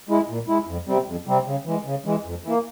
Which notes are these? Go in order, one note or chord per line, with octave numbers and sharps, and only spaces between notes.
G#3 E4
A#2
G#3 E4
F2
C3 G3 C4
F2
C3 G3 C4
C#3
E3 G#3
C#3
E3 G#3
F2
E3 A#3